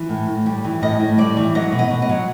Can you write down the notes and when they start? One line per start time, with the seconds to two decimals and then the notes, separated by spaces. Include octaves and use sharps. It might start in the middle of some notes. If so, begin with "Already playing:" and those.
Already playing: E3
0.09 A2
0.28 A2
0.46 G3
0.65 E3
0.81 A2 D#5
1.00 A2
1.18 G3 D5
1.37 E3
1.55 F#3 D#5
1.72 B2
1.79 D#5
1.90 B2
2.02 D#5
2.09 F#3